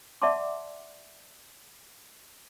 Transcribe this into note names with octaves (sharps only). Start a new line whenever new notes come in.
D5 E5 F#5 A5 C6 D6